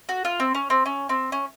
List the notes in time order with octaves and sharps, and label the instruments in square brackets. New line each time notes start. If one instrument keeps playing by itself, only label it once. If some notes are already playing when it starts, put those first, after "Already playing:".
[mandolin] F#4
F4
C4
C#4
C4
C#4
C4
C#4